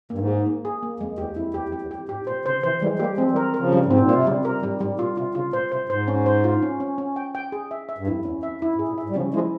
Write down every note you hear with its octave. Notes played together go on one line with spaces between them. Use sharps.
G2 A#3
G#2
G#4
A#3
G#4
A#3
F2 G#3
E2 G4
F2 E4
E2 G4
F2
G4
E2
F2 G4
G#2 G4
A#2 C5
C#3 C5
C3 E3 C5
E3 G3 G#3
G3 A#3 G4
F3 G#3 C4
E3 G3
A#4
C#3 F3 A#4
G3
G#2
C4
A#2
C3 F4
C#3 G3
C3 A#4
G#2 G3
G#2 G3
A#2 F4
C3 F4
C#3 F4
A#2 C5
C3 C5
G#2 C5
C#4
C5
F4
C#4
C#4
C#4
G5
G5
G#4
E5
E5
G2
F2 E4
E2 C#4
F2 E5
F2 E4
G#2
G#4
A#2
G#2 E5
G3
C#3 F3 C#4
F3 G#3 E4